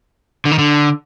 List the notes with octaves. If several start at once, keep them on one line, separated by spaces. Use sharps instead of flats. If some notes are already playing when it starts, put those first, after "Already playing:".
D3
D#3
D3